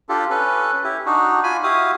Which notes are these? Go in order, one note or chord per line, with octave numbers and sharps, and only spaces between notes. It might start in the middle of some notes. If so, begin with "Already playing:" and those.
D4 F4 G4 A4
C#4 A4 B4
E4 G4
D4 D#4 F#4
F4 G#5 B5
E4 F#4 G4 F5 D#6